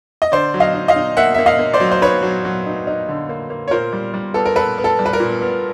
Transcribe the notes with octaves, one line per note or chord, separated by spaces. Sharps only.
D#5
D3 C5 D5
F#3
D#5 F5
D#4
D#5 F5
D#4
A#3 E5 F#5
A#3 E5
D#5 F5
A#3
C5 D5
F#3
C5
D#4 B4 C#5
F#3
F#3
D#4
D#4
D3
A#3
A#3
C#5
A#2 A#4 C5
G3
G3
B3 A4
A#4
B3 A4 B4
B3
A4
G3
B4
A#4
A#2
B3